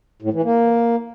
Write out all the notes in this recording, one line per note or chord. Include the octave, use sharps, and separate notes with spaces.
A2
E3
A#3